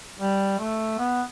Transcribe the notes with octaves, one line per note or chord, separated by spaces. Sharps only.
G3
A3
B3